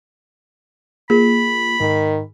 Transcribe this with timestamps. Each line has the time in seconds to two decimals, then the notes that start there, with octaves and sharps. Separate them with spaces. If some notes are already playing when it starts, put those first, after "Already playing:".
1.10 A#3 F4 G#4 B5
1.81 G#2 D#3